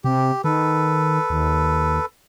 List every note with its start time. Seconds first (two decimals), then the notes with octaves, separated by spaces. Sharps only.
0.04 C3 G4
0.44 D#3 A4 B4
1.30 D#2